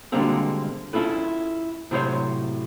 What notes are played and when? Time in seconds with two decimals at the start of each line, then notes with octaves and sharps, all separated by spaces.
0.12 B2 D3 G3 G#3 A#3 C4
0.93 C#4 E4 F4 A4 B4
1.91 A2 C3 F#3 C5 C#5